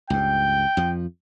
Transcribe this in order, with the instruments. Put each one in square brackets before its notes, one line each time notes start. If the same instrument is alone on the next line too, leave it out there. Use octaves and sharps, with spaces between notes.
[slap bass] C#2 G2 [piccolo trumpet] G5
[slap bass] F2 F3